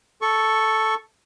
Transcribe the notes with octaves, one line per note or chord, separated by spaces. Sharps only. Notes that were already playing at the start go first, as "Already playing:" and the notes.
A4 C#6